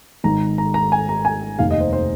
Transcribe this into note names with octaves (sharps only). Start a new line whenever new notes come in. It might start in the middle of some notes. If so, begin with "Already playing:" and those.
G#1 G#2 D#3 A#5
A#5
A#5
G#5
A#5
G#5
F1 D#2 D#3 F5
D#5
C5
C5